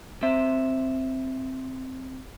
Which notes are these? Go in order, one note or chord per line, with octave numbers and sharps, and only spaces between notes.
C4 E5